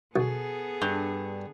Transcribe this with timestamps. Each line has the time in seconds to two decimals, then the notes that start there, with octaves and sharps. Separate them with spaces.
0.16 B1 B3 G#4 A4
0.82 G2